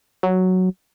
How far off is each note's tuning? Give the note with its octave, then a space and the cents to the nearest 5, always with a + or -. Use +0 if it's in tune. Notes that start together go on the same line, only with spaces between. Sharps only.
F#3 +0